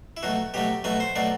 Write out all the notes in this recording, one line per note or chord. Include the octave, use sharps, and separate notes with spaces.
E4
B2 F#3 A3 F#4
B2 F#3 A3 G4
B2 F#3 A3 B4
C5
B2 F#3 A3 D5